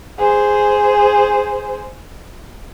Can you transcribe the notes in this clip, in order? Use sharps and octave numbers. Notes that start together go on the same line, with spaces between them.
G#4 C5